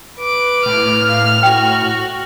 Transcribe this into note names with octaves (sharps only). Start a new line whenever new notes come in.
B4 D6
A2 F6
F5
F#4 G5